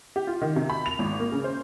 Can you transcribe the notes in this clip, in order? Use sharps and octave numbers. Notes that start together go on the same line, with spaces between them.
G4
F4
D#3
C3
B5
F7
G#1
A#3
C#3
C5